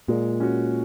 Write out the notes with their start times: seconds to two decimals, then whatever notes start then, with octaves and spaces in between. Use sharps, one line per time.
0.08 A#2 G#3
0.40 C#4 F#4